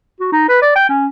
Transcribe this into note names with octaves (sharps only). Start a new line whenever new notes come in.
F#4
D#4
B4
D5
G5
C#4